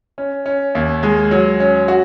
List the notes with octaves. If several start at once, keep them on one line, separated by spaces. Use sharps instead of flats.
C#4
C#4
D#2
G#3
F#3
C#4
F#4